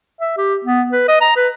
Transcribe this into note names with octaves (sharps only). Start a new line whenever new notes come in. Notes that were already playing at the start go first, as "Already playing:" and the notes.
E5
G4
B3
B4
D#5
A#5
B4